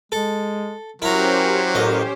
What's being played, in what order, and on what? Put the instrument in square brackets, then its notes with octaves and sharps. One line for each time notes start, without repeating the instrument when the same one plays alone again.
[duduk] G#3 [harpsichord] A4
[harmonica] F#3 [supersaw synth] C#4 G4 C5 [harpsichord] E4 A#5 [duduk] A#4
[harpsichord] A1 D#5 [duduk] A#4